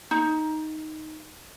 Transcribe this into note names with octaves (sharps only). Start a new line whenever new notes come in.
D#4